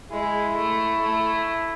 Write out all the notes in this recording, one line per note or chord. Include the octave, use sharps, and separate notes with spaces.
G#3 E4
A3
A3